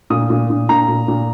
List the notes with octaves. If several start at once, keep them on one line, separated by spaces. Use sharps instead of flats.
A#2 D#6
A#2
A#2
A#2 A#5
A#2
A#2